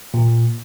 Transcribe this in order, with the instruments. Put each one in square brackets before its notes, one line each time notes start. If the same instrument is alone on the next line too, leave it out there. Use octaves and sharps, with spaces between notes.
[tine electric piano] A#2